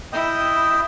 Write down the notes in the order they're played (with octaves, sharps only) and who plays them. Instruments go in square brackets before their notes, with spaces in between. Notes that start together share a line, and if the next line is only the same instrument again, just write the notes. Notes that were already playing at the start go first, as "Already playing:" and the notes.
[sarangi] E4 [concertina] D#5 G5 D#6